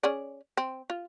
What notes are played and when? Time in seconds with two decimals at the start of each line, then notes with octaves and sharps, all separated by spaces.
0.03 C#4 G#4 D5
0.57 C4
0.90 F4